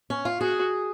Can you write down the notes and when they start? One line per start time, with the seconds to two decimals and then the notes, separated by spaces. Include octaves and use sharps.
0.10 C#4
0.25 F4
0.40 F#4 G#4